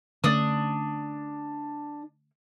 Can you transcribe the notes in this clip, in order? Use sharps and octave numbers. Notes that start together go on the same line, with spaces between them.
D3 A3 C#4 D4 D#6